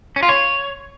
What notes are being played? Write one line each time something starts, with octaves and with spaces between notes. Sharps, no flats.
C#4
F4
C#5